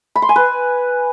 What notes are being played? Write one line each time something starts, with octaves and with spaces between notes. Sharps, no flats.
B5
C6
G#5
B4